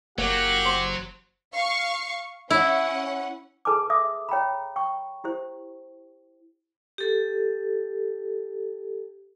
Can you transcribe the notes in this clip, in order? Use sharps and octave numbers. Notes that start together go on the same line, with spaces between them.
F#1 F#3 A#3 G4 F#5
C5
F5 C#6
C#4 E4 F#5
G#4 A4 B4 G#5 A5 D6
E5 D6 D#6
C#5 G5 A#5 B5
G5 C#6
E4 G4 C5
G4 A4